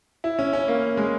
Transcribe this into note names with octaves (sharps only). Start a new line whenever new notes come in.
E4
C#4
C#4
A#3
G#3